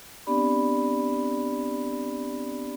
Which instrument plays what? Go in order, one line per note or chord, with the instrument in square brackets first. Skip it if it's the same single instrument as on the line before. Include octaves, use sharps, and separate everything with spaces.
[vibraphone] B3 C4 D4 G4 D5 B5